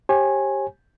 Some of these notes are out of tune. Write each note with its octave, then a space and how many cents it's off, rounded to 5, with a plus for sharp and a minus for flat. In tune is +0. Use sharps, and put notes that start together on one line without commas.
G4 +0 C#5 -45 G#5 +0